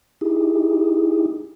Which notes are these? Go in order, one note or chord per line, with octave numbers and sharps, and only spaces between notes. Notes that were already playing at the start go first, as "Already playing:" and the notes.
D#4 E4 G4 G#4